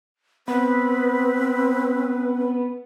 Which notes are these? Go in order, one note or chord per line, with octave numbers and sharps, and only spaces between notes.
B3 C4 B4